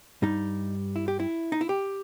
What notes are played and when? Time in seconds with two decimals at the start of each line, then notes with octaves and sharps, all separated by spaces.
0.22 G2 G3 D#4
0.96 E4
1.08 G4
1.20 E4
1.52 D#4
1.61 E4
1.69 G4